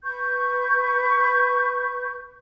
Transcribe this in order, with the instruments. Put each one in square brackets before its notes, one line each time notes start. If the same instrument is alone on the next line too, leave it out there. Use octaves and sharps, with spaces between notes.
[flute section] B4 C#6 G6